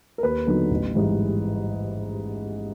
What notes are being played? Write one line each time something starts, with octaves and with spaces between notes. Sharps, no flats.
A#4
D#2 B4
D3 F#3 B3 D#4
A1
G#2 E3 G3